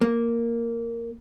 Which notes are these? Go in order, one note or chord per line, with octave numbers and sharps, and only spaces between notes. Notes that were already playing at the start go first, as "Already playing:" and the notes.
A#3